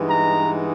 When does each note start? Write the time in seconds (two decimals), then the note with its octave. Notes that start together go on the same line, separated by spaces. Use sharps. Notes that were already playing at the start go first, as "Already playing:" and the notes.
Already playing: G2 E3 G#3 B3 D#4
0.09 A#5